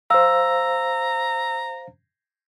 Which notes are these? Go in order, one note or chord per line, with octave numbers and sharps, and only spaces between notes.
C5 F5 A#5 E6